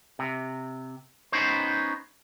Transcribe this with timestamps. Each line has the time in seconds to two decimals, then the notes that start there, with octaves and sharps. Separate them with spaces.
0.19 C3
1.32 B3 C#4 D#4 C5